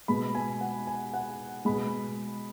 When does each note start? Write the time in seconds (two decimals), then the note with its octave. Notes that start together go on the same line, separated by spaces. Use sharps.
0.08 B2 G#3 B5
0.35 G#5
0.61 F#5
0.87 G#5
1.14 F#5
1.65 B2 G#3 B5